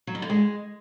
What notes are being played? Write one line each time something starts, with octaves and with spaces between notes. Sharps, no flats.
F#3
G3
D3
G#3